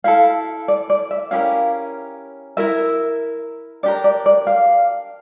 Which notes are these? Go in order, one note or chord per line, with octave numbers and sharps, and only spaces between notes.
E4 A4 F5
D5
D5
E5
C#4 E4 G4 A#4 F5
E4 A#4 E5
D4 G4 A#4 D5
D5
D5
F5